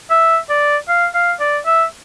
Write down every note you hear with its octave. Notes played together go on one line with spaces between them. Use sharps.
E5
D5
F5
F5
D5
E5